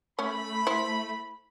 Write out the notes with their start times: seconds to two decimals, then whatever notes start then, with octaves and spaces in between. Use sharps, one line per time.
0.19 A3 C#4 B5
0.67 E4 C5